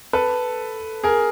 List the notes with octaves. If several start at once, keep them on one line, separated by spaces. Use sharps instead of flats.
A4 B4
G#4 A#4